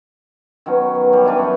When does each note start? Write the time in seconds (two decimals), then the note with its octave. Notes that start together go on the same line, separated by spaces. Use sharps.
0.66 D#3 F#3 B3 C#4
0.95 F#3
1.13 G3
1.25 E3 C#4 D4 B4
1.39 F#2